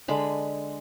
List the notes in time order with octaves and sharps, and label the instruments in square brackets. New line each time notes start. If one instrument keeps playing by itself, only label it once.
[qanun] D3 G#3 B5